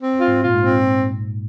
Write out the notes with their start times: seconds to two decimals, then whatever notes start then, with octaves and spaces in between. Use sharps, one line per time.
0.01 C4
0.21 F4
0.28 G#2
0.41 A#2 F4
0.54 G#2
0.61 C4